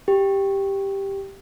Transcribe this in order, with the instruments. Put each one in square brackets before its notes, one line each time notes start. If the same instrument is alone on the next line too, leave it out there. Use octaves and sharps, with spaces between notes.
[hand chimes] G4